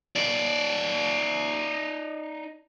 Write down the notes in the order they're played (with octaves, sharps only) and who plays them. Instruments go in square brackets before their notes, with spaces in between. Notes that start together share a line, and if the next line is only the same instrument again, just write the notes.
[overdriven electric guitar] D#4 D5